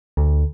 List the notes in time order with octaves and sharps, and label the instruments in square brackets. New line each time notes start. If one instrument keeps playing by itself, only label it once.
[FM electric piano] D2